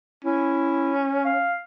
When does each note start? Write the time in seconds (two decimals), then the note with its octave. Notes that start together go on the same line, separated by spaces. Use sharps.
0.25 C#4 E4
1.25 F5